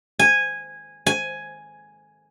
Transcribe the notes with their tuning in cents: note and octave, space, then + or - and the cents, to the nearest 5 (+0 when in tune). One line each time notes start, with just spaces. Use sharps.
G#5 -10
G#5 +5